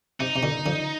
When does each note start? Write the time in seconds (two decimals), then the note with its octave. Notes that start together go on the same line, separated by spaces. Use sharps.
0.20 C3 D#4
0.36 C3
0.43 B2 D3
0.66 D3 F3